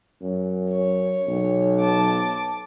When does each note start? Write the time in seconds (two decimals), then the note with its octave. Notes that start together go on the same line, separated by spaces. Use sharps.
0.21 F#2
0.71 C#5
1.27 B1
1.81 A5 D6